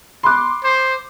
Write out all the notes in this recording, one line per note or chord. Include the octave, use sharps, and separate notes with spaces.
B5 C6 D6 F#6
C5